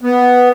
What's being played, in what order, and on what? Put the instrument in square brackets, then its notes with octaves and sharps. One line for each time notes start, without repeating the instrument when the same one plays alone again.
[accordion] B3